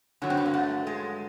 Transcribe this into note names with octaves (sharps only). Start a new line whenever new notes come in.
G2 D3 F#3 C#4
C4
B3
A#3
A3
G#3